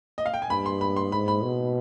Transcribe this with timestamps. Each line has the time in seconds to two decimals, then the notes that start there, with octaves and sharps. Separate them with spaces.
0.18 D#5
0.26 F5
0.34 G5
0.42 G#5
0.50 G2 B5
0.66 C6
0.81 B5
0.96 C6
1.12 G#2 B5
1.28 B5
1.43 B2